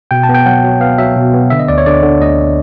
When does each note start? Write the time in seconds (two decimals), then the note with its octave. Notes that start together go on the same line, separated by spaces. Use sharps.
0.11 B2 G5
0.24 A5
0.29 B3
0.34 G5
0.46 F#3 F#5
0.64 F#3
0.81 B3 F5
0.98 F#3 E5
1.16 B2
1.34 B3
1.50 D3 E5
1.59 D#5
1.68 D2 D5
1.78 C#5
1.86 D3 D5
2.03 D3
2.21 D2 D#5